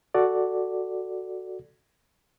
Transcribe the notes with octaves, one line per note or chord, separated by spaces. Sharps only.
F#4 A4 D5